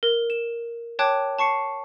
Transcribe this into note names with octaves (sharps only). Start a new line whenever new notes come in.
A#4
E7
C#5 G5 A5 D6 F#6
A5 C#6 C7 C#7